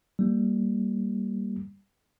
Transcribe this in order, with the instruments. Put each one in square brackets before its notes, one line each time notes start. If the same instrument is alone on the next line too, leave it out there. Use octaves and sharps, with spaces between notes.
[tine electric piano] G3 A#3